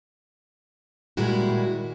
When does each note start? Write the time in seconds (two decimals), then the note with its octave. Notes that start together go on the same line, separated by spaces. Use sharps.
1.17 A#2 D#3 G3 G#3 E4 F#4